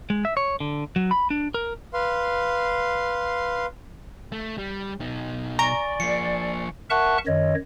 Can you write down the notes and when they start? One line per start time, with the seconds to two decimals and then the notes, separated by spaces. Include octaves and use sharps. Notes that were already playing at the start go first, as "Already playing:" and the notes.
0.10 G#3
0.25 E5
0.37 C#5
0.60 D3
0.96 F#3
1.11 B5
1.30 D4
1.54 A#4
1.94 B4 F5 C6
4.32 A3
4.58 G3
5.01 B2 D#4
5.59 D5 G#5 A#5 C#6 D7
6.00 F3 A#3 C7 C#7
6.90 A#4 E5 F#5 A5 C#6 F#6
7.27 F#2 D#3 C#5 D#5